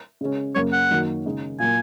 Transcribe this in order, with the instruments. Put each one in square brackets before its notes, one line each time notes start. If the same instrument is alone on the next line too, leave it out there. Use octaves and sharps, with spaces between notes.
[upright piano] C#3 G#3 C#4
[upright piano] F#2 C#3 A#3 C#4 [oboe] C#5
[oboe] F#5
[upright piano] F#2 D#3 A#3 F#4
C#3 G#3 D#4
[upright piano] A#2 F#3 A#3 [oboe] G#5